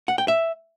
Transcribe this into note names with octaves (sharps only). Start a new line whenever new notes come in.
F#5
G5
E5